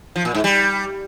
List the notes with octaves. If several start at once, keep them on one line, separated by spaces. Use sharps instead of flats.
F3
A#2
G#2
G3